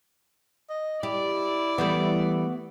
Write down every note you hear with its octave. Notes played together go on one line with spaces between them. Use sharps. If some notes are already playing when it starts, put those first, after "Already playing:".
D#5
E4 G4 D5
E3 G3 A3 B3